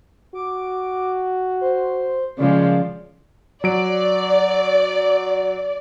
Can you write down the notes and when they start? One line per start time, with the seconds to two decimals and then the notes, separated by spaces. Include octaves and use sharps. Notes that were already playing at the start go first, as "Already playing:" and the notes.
0.34 F#4 D6
1.61 C5
2.38 A#2 C#3 F3 G#3 D5
3.64 F#3 D5 D7